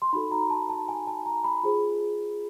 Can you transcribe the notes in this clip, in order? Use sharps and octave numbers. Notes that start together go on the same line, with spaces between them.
C6
D#4 F#4 A4 B5
A#5
A5
A5
G#5
A5
A#5
B5
F4 G#4 C5